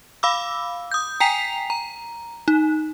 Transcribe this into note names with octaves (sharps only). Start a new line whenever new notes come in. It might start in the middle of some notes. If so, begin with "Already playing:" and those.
F5 B5 D6 E6
D#6 G6
G5 G#5 A#5 B6 C7 F7
A#5
D#4